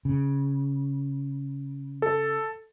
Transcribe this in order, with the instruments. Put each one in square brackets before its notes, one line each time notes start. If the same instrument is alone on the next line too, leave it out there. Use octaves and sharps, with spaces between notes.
[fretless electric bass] C#3
[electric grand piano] A4